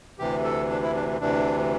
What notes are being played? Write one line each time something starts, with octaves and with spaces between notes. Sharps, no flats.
D2 C3 E3 G4
A4
D4
E4
D4
D2 C3 E3 D4